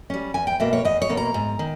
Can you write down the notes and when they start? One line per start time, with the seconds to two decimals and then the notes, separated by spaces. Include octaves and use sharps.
0.10 G3 C#4
0.34 E2 G#5
0.47 G5
0.60 B2 A#3 E5
0.73 C#5
0.85 E2 D#5
1.02 C#5
1.09 B2 A#3
1.17 A#5
1.34 G#2
1.59 D#3